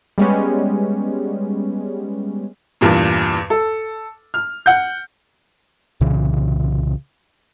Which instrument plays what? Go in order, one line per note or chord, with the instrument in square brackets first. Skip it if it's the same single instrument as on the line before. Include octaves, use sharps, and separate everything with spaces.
[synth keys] G3 G#3 B3 C#4
[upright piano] E2 G2 A#2
A4
F6
F#5 G6
[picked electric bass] C2 A#2 C#3 E3